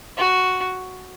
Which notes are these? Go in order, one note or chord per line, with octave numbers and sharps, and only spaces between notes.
F#4